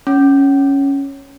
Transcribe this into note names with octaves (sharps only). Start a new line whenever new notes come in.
C#4